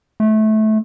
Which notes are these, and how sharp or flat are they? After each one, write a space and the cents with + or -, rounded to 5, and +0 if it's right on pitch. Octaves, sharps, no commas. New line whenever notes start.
A3 -20